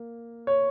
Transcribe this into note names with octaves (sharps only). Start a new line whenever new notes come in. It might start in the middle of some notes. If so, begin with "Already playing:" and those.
Already playing: A#3
C#5